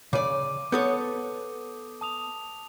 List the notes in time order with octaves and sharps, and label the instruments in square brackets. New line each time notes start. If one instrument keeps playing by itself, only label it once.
[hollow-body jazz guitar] C#3 D5 [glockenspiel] D6 D#7
[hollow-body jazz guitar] B3 A4 C#5 [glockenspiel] D#6 G6
[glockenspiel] A5 D#6 F7